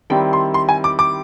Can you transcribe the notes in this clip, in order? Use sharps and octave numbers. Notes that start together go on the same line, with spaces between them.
D#3 G3 C4 E4 G5
C6
C6
G#5
D6
D6